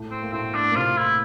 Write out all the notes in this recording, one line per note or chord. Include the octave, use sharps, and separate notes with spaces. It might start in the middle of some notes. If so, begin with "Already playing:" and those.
Already playing: A2 A3
C4
A#3
A2 A3 C4
D4
A#3
C3 C4 F4
E4